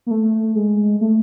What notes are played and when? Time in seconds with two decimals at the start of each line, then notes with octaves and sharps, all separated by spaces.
0.06 A#3
0.11 A3
0.55 G#3
1.01 A3